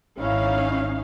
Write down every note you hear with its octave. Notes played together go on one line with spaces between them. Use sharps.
G#1 C#4 D#4 E4 F5